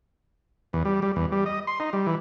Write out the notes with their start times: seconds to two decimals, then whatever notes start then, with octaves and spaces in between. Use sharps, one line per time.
0.73 E2
0.85 G3
1.02 G3
1.16 E2
1.32 G3
1.46 D#5
1.67 C6
1.80 D#4
1.93 G3
2.07 E3